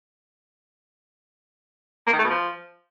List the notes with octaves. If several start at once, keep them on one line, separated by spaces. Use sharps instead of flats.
A#3
D#3
A3
B2
F3